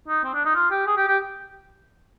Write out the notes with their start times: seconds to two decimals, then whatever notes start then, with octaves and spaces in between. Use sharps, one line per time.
0.08 D#4
0.24 C4
0.34 D4
0.45 D#4
0.55 F4
0.71 G4
0.87 G#4
0.97 G4
1.07 G4